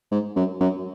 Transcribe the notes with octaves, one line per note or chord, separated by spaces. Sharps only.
G#2
F#2
F#2